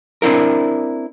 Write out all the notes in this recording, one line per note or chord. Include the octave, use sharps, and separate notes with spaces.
C4 D4 E4 A#4